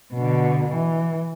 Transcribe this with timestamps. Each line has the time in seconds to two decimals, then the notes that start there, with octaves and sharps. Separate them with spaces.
0.14 B2 D3
0.72 E3